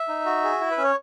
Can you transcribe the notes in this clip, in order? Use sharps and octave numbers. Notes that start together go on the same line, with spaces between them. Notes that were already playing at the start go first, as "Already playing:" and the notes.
Already playing: E5
D#4
F#4
G#4
E4
B4
C#4
C#5